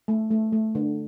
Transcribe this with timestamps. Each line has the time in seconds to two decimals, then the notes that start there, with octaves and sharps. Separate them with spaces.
0.08 A3
0.31 A3
0.53 A3
0.75 D3